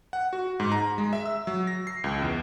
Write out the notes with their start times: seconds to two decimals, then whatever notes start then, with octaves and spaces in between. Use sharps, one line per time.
0.13 F#5
0.33 F#4
0.60 G#2
0.72 A#5
0.98 G#3
1.13 E5
1.26 E6
1.47 F#3
1.67 A#6
1.87 C7
2.04 C#2
2.22 E2